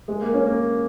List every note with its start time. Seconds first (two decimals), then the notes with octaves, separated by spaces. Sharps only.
0.08 G#3
0.21 A#3
0.34 C#4
0.46 A#3